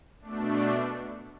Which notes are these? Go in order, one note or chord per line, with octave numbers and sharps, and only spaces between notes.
B2 A3 D4